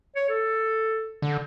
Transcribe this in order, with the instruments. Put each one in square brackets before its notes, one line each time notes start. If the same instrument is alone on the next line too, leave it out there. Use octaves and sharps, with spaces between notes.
[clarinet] C#5
A4
[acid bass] D3